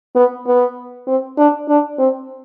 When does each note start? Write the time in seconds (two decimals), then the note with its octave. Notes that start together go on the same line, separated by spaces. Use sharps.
0.15 B3
0.47 B3
1.07 C4
1.37 D4
1.69 D4
1.99 C4